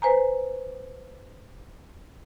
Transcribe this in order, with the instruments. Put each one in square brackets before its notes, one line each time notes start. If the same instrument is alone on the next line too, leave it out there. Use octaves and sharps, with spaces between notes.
[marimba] B4 C5 G#5 A#5